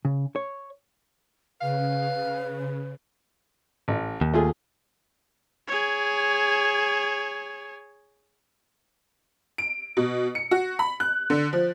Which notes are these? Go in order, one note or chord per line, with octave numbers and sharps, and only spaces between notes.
C#3
C#5
C#3 B4 F5
A1
D#2
A3 F4 G#4
G#4 C#5
D7
B2
C#7
F#4
B5
F#6
D3
F3